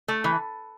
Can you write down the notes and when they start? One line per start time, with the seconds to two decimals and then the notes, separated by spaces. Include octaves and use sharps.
0.08 A3
0.24 E3